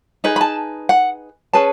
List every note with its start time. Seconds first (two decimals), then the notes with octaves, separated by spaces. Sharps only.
0.24 D#4 G#4 B4
0.36 B5
0.41 A5
0.89 F#5
1.53 C#4 G#4 B4 A5